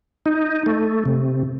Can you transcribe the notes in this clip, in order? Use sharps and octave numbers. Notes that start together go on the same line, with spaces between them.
D#4
A3
C3